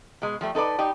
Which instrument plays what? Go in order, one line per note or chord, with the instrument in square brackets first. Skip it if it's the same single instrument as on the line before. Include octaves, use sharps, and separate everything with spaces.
[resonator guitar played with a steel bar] B2 G#3
F3 G3 A3
D#4 A4 B4 D5
D#4 G4 D5